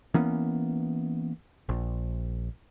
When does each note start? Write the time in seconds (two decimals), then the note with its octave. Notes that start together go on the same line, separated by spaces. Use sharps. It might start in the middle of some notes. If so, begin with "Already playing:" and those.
0.14 E3 A#3 B3 C#4
1.69 A#1